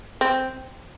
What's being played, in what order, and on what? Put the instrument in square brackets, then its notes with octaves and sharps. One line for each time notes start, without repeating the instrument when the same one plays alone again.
[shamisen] C4